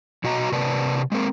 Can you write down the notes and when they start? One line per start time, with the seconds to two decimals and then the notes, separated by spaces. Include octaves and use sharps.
0.24 B2 F#4 D#5 A#5
0.52 C3 A#4 B4 D5 A5
1.12 G#3 A#3 C4 A#4